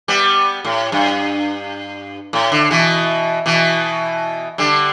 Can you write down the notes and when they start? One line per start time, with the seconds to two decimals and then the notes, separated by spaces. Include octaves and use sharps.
0.08 G3 B3
0.65 A2
0.92 G2
2.33 A2
2.52 D3
2.71 B2 E3
3.46 B2 E3
4.58 D3 G3